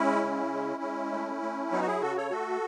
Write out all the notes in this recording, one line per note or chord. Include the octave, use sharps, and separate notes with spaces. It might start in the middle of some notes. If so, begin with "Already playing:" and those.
Already playing: G#3 C#4 E4
C#3
G#3
G#3
A3
A3
F#3 B3 D#4
F#4
E4 G#4
C#3 F#4 A4
A4 C#5
A3 F#4 A4